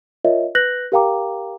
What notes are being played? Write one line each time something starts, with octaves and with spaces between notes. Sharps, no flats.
F4 A#4 C#5 D#5 E5
B4 F#6 G6 A#6 F#7
G4 A#4 F5 G5 A#5 D6